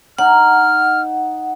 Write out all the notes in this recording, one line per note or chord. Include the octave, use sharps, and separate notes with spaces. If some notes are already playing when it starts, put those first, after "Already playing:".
D#4 F#5 F6